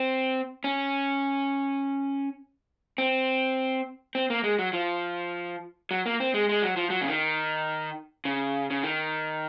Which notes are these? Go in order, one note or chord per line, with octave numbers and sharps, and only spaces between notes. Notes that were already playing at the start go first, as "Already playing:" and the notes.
Already playing: C4
C#4
C4
C4
A#3
G#3
F#3
F3
F#3
A#3
C4
G#3
G#3
F#3
F3
F#3
C#3
D#3
C#3
C#3
D#3